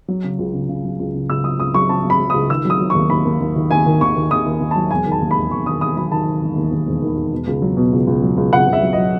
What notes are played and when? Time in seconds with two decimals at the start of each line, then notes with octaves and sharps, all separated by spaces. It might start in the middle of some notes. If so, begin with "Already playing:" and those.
0.08 F#3
0.24 C#3
0.39 C#2
0.54 C#3
0.69 C#3
0.84 F#3
1.00 C#2
1.14 C#3
1.29 C#2 E6
1.44 F#3 D#6
1.60 C#2 D#6
1.74 F#3 C#6
1.89 C#3 A5
2.05 F#3 B5
2.19 F#3
2.30 C#2 D#6
2.50 D#3 E6
2.65 F#3 D#6
2.80 F#3
2.90 D#2 C#6
3.10 D#2 B5
3.25 D#2
3.40 D#2
3.56 D#3
3.71 D#2 G#5
3.86 D#3
4.00 D#2 C#6
4.16 D#2
4.31 D#2 D#6
4.46 D#2
4.61 D#2
4.71 F#3 A5
4.91 E1 G#5
5.06 D#3
5.12 A5
5.21 D#2
5.31 B5
5.36 E1
5.51 E1 C#6
5.66 D#2 D#6
5.81 E1 D#6
5.97 F#3 B5
6.12 D#3 A5
6.27 D#3
6.42 E1
6.56 D#2
6.72 D#2
6.87 E1
7.02 D#3
7.16 E1
7.32 B2
7.47 C#2
7.62 F#3
7.77 B2
7.93 C#2
8.07 C#2
8.23 F#3
8.37 C#2
8.53 C#2 F#5
8.67 C#2
8.73 E5
8.82 F#3
8.93 D#5
8.98 F#3